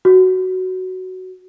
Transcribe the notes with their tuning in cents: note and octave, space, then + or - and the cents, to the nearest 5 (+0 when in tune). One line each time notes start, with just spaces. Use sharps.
F#4 +5